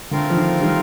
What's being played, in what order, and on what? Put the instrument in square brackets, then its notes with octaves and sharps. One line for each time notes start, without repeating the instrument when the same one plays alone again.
[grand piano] D3 [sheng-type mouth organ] A3 C4 F4 A#4 F5
[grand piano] F3
D#3
D#3 G3